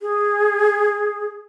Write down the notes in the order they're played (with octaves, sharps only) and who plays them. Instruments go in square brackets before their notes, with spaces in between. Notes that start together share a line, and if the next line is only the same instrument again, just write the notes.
[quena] G#4